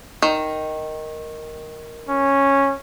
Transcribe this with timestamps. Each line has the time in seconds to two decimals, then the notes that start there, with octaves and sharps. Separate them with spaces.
0.22 D#3
2.09 C#4